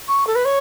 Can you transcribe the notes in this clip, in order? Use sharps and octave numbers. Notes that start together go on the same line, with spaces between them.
C#6
A4
B4
C#5